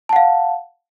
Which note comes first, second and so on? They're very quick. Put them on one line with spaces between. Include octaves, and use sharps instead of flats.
A5 F#5 F5